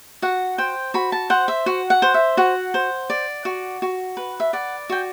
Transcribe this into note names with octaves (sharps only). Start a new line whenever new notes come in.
F#4 F#5
C5 G5
F#4 B5
A5
C5 F#5
E5
F#4 F#5
F#5
C5
E5
F#4 F#5
C5
D5
F#4
F#4
B4
E5
D5 F#5
F#4 G5